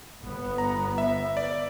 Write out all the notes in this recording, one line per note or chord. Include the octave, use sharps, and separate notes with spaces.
G1 B3
A#5
E5
D5